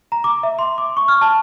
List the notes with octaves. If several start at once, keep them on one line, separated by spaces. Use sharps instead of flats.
A#5
D6
E5
C6
D6
C#6
F6
A5